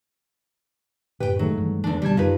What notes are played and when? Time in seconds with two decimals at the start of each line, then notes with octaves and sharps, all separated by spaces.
1.20 F#2 A2 C#3 G4 B4 G5
1.39 D#3 F#3 G#3 A3
1.57 G2 E3
1.84 E2 C#3 E3 D4
2.02 D2 B2 G3 A5 G#6
2.17 F#2 D#3 F4 G4 B4